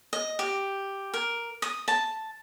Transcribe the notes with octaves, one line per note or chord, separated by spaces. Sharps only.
D#5
G4
A#4
D#6
A5